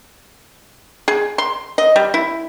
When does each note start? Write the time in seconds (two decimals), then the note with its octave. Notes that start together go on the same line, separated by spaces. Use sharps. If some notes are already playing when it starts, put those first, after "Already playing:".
1.08 G#4
1.38 C6
1.78 D#5
1.96 G3
2.14 E4